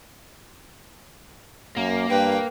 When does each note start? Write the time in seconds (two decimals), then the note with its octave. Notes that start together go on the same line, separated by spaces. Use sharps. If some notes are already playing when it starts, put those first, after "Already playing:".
1.77 F#2 A#3
2.10 G2 B4 G5